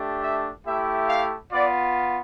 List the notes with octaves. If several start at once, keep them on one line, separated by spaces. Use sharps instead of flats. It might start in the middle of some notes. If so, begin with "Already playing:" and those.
Already playing: A3 D4 G4
E5
A3 E4 G4 E5
F5
B3 F4 D5